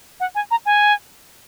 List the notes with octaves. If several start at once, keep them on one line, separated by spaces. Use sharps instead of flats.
F#5
G#5
A#5
G#5